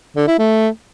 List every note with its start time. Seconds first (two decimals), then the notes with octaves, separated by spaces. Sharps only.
0.17 D3
0.28 E4
0.39 A3